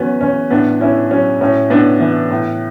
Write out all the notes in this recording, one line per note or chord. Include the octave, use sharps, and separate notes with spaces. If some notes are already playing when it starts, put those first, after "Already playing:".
Already playing: E2 F#3 B3 C#4
E2 C#4
A2 B3 D4
A2 C#4 E4
F#3 C#4
A2 C#4
A2 B3 D4
E3 B3
A2